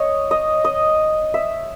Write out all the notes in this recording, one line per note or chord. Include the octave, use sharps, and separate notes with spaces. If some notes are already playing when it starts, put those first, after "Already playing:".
Already playing: C#5 D#5
D#5
D#5
E5